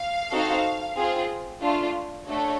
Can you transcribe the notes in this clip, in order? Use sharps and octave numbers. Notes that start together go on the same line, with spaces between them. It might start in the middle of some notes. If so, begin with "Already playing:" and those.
Already playing: F5
C4 D#4 F#4 A4
C4 F4 G#4
A3 D4 F4
A3 D4 F#4 A4 C#5